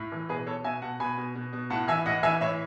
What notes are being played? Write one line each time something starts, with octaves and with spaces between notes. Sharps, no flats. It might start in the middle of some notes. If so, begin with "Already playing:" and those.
Already playing: A2
E3
B2 G#4 B4
B2 A4 C#5
B2 E5 G#5
B2 F#5 A5
B2 G#5 B5
B2
B2
B2
A2 F#5 A5
E3 E5 G#5
A2 D#5 F#5
E3 E5 G#5
A2 C#5 E5